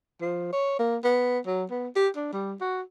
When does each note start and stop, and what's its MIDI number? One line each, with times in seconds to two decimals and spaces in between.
0.21 0.51 53
0.53 0.75 73
0.79 0.97 58
1.04 1.39 59
1.47 1.65 54
1.71 1.89 59
1.96 2.09 67
2.16 2.31 62
2.34 2.54 55
2.61 2.82 66